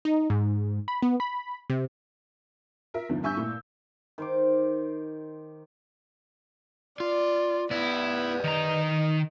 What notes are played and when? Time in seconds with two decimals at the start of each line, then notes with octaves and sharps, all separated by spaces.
0.05 D#4
0.30 G#2
0.88 B5
1.02 B3
1.20 B5
1.70 C3
2.94 F4 A#4 E5
3.09 G1 E2 D3 D#3 F3
3.23 G2 E5 G#5 C#6 E6 G6
3.37 A#2 A3 E4
4.18 D#3 C5 D6
7.00 F4 D5
7.71 B3 E4 B4 D5
8.44 D#3 D#5 A#5